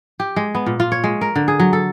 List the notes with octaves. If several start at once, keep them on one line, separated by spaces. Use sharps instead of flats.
G4
G#3
B3
A#2
F4
C#5
G#3
A#4
D3
G#4
F#3
A4